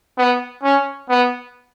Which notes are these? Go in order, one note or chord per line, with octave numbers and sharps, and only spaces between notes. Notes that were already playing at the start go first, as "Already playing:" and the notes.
B3
C#4
B3